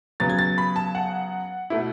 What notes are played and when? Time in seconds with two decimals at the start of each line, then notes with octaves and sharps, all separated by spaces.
0.20 C#3 F#3 B3 A6
0.30 G#6
0.39 A6
0.58 B5
0.76 A5
0.95 F#5
1.70 B2 A3 E4